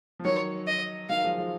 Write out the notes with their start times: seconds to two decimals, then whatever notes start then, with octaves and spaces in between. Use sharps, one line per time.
0.19 F3
0.24 D#3 F#3 C#5
0.67 D#5
1.09 D#3 F#3 F5
1.24 F3 G#3
1.38 F3 G#3